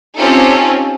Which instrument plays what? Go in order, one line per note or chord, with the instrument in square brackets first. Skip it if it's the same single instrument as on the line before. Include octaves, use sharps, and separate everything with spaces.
[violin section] C4 C#4 D#4 F4 G4 A4